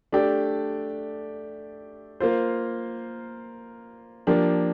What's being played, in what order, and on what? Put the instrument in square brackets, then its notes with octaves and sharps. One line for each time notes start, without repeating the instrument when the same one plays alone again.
[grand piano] A3 D4 G4 D5
A#3 F4 C5
F3 A#3 D4 G4